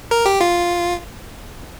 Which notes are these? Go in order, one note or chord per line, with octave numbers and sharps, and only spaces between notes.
A#4
G4
F4